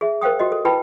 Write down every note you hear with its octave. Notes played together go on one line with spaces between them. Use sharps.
G#4 E5
A#4 C5 F5 G5 D#6
F#4 G4 D#5
A4
E4 B4 G5 A5 B5